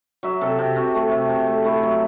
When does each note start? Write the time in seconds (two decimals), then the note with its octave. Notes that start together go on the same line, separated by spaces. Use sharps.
0.23 F#3 E5
0.41 C3 A4
0.58 C3 G4
0.76 C3 F#4
0.95 A3
1.11 C3
1.29 C3
1.47 A3
1.64 A3 E4
1.83 F#3